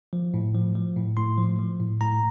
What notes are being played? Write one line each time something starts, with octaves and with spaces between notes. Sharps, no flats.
F3
A2
F3
F3
A2
A2 C6
F3
F3
A2
A2 A#5